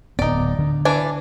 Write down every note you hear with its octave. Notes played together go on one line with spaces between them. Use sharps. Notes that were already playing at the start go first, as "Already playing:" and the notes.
D1 B3 D#4 D5
D3
E3 D4 G#5